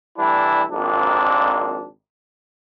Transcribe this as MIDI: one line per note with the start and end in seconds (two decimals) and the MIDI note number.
0.19 0.63 52
0.19 0.63 55
0.19 0.63 57
0.19 0.63 62
0.19 0.63 64
0.71 1.87 32
0.71 1.87 41
0.71 1.87 46
0.71 1.87 60
0.71 1.87 62